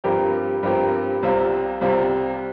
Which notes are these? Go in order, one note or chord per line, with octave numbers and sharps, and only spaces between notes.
G2 F3 C4 G4 A#4
G2 F3 C4 G4 A#4
C2 C3 G3 C4 F4
C2 C3 G3 C4 F4